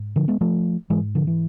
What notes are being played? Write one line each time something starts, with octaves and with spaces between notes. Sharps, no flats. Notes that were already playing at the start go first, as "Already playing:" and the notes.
Already playing: G#2
D3 F3
G#3 B3
F3 A3
G#2 E3 G#3
D3 F3
E3